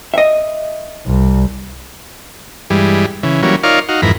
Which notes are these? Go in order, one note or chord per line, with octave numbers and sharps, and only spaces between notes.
D#5 E5
C2
G2 E3 G3 G#3
C#3 E3
E3 F#3 G3 A#3 C#4
D#4 F4 A#4 C#5 D5 F5
D#4 F#4 F5
F2 G#2 E3 A#4 B5